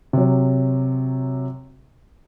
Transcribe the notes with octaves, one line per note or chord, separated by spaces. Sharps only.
C3 F#3